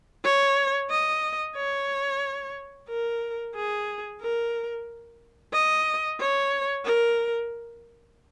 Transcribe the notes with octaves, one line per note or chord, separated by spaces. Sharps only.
C#5
D#5
C#5
A#4
G#4
A#4
D#5
C#5
A#4